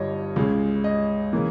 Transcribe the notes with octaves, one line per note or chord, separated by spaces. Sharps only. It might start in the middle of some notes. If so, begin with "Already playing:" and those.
Already playing: G1 G2 G3 C#5 D#5
C#2 C#3 G#3 C#4
D#5
C#3 E3 A#3